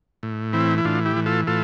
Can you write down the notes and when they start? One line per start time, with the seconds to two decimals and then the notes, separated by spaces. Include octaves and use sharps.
0.23 A2
0.53 E3 C4 E4
0.78 E4
0.85 A2 D4 F4
1.05 E4 G4
1.16 E3
1.26 F4 A4
1.47 A2 F4 A4